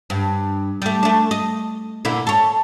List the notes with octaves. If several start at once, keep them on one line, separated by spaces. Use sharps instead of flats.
G2
G3 A3
A3 D4
D#5
A#2 D3 E4
A4 C#5